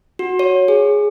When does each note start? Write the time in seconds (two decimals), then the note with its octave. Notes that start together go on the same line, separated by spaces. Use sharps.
0.19 F#4
0.39 C#5
0.68 G#4